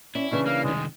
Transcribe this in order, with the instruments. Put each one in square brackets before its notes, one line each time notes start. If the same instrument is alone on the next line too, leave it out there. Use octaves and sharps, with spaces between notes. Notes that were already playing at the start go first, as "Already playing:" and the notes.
[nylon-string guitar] C#4 D5 [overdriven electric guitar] E4
[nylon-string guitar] C#3 E3 D4 [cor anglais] C#4
[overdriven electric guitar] A#3 [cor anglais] F5
[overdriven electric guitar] C2 D#3 [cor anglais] G#3